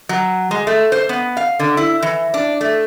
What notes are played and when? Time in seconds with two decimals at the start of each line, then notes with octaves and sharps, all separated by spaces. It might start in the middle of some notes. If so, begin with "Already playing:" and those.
0.09 F#3
0.51 G#3
0.67 A3
0.92 C5
1.09 B3
1.37 F5
1.59 D3
1.77 E4
2.02 E3
2.34 D4
2.61 A3